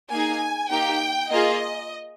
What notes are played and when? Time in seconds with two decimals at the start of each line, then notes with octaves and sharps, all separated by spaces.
0.11 A#3 D#4 G#4 G#5
0.70 A#3 D#4 G4 G5
1.31 A#3 F4 G#4 D#5